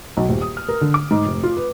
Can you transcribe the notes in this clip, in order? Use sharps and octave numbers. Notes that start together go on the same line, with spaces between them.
B1
D#1
D#6
F6
A#4
D3
D6
G#2
F1
F4
B4